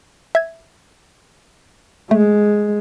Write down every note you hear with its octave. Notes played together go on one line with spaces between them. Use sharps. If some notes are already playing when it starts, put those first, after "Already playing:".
E5 G#6
G#3 A3